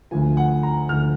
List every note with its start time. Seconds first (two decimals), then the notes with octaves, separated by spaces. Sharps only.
0.11 D2 D3 F3 G#5
0.37 F#5
0.63 A#5
0.89 D2 D3 F3 F6